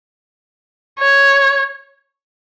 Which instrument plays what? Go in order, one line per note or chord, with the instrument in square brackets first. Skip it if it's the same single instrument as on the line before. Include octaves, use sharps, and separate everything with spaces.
[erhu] C#5